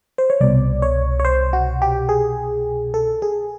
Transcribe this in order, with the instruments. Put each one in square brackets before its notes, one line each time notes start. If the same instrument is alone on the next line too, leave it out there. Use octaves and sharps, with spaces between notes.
[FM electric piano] C5
C#5
C2 B2 D5
C#5
C#5
C5
F#4
G4
G#4
A4
G#4